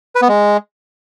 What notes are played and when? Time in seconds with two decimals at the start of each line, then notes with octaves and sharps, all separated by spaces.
0.15 B4
0.22 B3
0.29 G#3